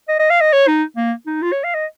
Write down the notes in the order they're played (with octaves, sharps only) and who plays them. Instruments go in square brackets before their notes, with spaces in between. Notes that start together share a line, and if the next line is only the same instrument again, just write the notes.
[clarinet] D#5
D#5
F5
D#5
C#5
D#4
A#3
D#4
F4
C#5
F5
D#5